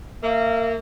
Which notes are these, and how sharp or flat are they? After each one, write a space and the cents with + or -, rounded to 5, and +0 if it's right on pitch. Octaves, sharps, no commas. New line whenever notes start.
A#3 -25 E5 +0